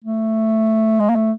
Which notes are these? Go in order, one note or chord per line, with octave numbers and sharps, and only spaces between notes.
A3
G#3
A#3
A3